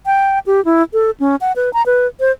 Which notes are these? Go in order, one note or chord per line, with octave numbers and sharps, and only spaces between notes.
G5
G4
E4
A4
C#4
F#5
B4
A#5
B4
C5